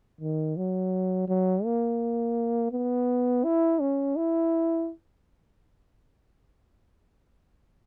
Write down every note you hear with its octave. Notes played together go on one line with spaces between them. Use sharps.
D#3
F#3
F#3
A#3
B3
E4
C#4
E4